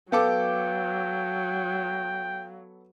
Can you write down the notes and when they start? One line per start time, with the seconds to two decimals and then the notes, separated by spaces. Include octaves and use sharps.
0.12 F#3 B3 A4 F5 G5 D6